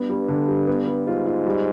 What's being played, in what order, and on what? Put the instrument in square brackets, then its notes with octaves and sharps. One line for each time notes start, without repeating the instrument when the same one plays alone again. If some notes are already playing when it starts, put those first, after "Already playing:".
Already playing: [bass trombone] G2 [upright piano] B3
[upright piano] G3
D3
G3
B3
G3
[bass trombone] G#2 [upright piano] F4
[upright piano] F4
G3